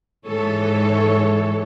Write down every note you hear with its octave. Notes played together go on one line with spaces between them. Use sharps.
G#2 E3 G#3 A4 C#5